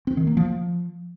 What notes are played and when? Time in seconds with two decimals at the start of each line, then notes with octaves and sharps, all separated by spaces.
0.07 C4
0.17 D#3
0.27 A#3
0.37 F3